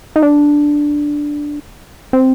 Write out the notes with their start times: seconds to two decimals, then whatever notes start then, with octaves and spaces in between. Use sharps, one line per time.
0.16 D#4
0.22 D4
2.13 C4